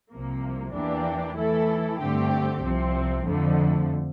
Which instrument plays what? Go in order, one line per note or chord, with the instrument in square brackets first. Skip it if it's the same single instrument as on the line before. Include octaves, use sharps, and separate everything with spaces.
[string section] C2 C3 F3 A#3
E2 E3 A#3 D4 G4
E3 A3 E4 A4
G2 D3 A3 C4 G4
C2 C3 F3 C4
F2 D3 F3 A3